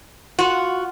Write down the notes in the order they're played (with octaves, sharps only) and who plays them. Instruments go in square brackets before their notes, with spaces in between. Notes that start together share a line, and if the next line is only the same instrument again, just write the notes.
[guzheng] F4 F#5 [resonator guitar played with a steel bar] F#4